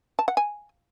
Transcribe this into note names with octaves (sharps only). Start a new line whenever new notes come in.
A5
F#5
G#5